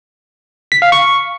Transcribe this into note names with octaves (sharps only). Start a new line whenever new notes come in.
B6
F5
C#6